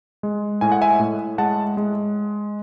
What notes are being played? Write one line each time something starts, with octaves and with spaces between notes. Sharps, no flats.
G#3
A2 G#5
F#5
E5 G#5
A2
G#3 F#5 A5
G#3